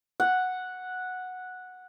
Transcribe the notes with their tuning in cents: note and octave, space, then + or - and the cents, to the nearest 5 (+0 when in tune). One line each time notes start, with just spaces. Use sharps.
F#5 -5